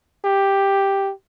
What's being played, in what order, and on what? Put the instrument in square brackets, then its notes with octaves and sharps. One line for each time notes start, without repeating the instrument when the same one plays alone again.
[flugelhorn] G4